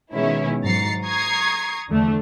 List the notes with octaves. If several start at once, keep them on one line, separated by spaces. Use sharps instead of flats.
B2 D#3 G#3 C#4 E4
G#2 F#3 A#5 A6 C7 C#7
A#5 C#6 D#6 G#6 C7
E2 D3 F3 A3 D4